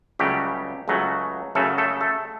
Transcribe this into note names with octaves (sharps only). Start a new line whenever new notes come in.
C#2 C#3 F#3 G3 A3 G4
C#2 C#3 F#3 A3
F#2 C#3 F#3 A3 A4
A3 A4
A3 A4